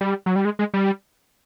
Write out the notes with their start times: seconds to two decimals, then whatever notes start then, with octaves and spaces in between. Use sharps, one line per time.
0.01 G3
0.26 F#3
0.36 G3
0.45 G#3
0.59 G#3
0.74 G3